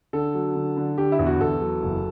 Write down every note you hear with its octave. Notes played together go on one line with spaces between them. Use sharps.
D3 A4
F#3
D3
D3
D3 G4
E4
E2
F#4
E2 A4
F#3
F#1